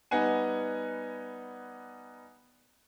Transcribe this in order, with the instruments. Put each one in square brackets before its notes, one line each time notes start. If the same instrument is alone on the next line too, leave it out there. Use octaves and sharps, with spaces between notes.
[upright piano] G3 B3 D#4 F#5 G#5